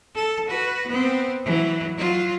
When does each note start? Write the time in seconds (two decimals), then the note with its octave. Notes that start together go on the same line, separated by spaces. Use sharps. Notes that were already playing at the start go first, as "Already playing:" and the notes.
0.14 A4
0.48 F#4 B4
0.87 B3 C4
1.44 E3 F#3
1.97 F#3 F4